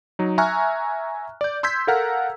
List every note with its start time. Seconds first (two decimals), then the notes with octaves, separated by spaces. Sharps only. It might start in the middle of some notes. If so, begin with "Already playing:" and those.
0.19 F#3 D#4
0.38 E5 G#5 A#5 C#6 F6 F#6
1.41 D5 G6
1.63 C6 E6 G6 G#6 B6
1.87 A4 A#4 F5 F#5 A#5 F6